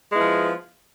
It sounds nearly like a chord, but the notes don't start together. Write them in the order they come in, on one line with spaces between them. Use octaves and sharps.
G#3 B3 E4 F3